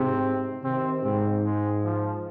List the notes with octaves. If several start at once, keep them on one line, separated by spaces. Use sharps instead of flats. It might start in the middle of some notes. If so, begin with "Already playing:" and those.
Already playing: G#2 C3 C4
C3 D#3 C4
G#2 C4
G#3
F3